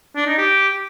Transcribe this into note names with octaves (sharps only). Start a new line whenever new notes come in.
D4
D#4
G4